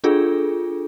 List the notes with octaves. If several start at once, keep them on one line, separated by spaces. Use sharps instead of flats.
D4 F4 G#4 A4